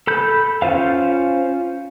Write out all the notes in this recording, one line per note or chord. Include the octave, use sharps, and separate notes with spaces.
A4 B5 G6
C#4 F4 C5 F5